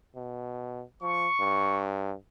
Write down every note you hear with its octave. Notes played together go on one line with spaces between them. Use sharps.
B2
F3 C#6
G2